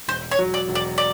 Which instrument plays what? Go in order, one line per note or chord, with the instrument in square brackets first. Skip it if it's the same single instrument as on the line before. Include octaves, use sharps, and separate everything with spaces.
[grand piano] E1 [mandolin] C5
[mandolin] C#5
[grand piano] F#3
[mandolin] D5
[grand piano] E1
[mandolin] D5
D5